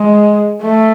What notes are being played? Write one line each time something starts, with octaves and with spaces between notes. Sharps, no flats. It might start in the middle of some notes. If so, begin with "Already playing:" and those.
Already playing: G#3
A3